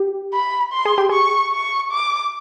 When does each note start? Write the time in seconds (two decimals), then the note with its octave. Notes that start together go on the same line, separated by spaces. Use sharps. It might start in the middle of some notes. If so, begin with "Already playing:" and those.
Already playing: G4
0.33 B5
0.73 C6
0.85 G#4
0.98 G4
1.09 G#4 C#6
1.52 C#6
1.92 D6